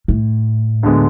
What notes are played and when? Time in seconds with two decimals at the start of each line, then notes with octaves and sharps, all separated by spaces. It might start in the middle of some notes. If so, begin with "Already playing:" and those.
0.08 A2
0.83 D2 D3 G#3 B3